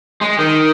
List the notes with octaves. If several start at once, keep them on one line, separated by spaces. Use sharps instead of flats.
G#3
D#3